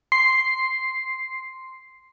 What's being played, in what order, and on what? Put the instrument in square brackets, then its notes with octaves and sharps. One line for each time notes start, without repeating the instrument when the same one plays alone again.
[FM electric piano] C6 C7